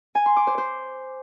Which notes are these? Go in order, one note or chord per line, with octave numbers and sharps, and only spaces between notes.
G#5
C6
D6
C5
C5